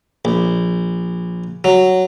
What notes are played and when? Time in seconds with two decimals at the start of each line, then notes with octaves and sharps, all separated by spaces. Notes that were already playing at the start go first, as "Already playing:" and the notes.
0.25 A#1
1.64 F#3